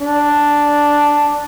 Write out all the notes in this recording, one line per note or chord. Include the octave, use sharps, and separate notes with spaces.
D4